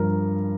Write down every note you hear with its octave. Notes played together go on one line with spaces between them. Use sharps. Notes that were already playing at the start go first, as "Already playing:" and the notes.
Already playing: G2 F3 A#4